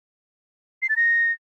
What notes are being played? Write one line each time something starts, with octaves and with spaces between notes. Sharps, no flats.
C7
A6
A#6